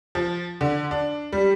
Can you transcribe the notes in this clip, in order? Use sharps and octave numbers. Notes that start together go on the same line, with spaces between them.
F3
D3
D4
G3